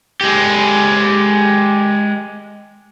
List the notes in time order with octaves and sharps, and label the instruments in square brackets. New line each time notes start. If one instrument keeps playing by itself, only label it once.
[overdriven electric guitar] G#3 G4